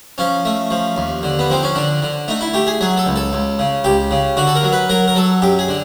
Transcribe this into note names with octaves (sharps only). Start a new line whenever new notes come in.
F3 C#4
A3
F3
D#2
D3
B3
F3 C4
C#4
D3 D4
D3
A3 D#4
E4
A3 G4
G#4
F#3 G#4
A4
C#2
A4
C#2
C#3
C#2 G4
C#3
D3 F#4
A4
A#4
F#3
B4
F#3 A#4
A#4
F#3 A4
F#2 G4
G#4
D3